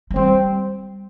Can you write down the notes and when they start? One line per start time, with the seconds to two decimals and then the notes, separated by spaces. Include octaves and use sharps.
0.11 A3
0.16 G3 C4